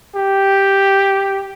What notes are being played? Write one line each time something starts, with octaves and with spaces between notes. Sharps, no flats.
G4